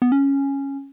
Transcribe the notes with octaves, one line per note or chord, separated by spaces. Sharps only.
B3
C#4